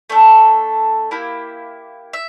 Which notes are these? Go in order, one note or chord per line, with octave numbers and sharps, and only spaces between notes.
A3 D4 A4
A#3 E4 G4
E5